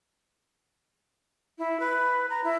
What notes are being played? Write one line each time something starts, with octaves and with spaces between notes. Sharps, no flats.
E4
B4
A#5
E4